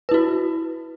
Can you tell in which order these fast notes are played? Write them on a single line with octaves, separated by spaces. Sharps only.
B4 E4 F#4